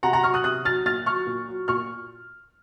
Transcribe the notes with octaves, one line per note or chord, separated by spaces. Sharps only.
C3 F#5 A#5
F#5 A#5
F#3 C#6 F6
D#6 F#6
C3 D#6 F#6
F#3 F6 A6
A#2 F6 A6
F#3 C#6 F6
A#2
F#3
A#2 C#6 F6